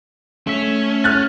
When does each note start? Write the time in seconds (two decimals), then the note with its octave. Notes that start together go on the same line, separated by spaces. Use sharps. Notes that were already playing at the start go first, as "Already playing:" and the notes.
0.47 A3 C#4 E5
1.04 F6 F#6 A6